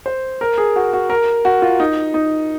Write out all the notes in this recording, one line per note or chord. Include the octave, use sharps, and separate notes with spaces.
C5
A#4
G#4
F#4
F#4
A#4
F#4
F4
D#4
D#4